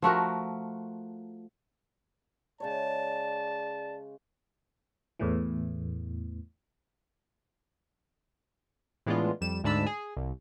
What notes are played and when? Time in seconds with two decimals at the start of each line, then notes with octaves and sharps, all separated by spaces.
0.02 F3 A3 F#4 A#4
2.60 C#3 G#3 C#5 D5 A5
5.19 E2 A2 E3
9.06 A2 E3 G#3 B3 D4 F4
9.41 F2 G3 E7
9.64 D2 G#2 D4 A5 B5 E6
9.86 G#4
10.17 C2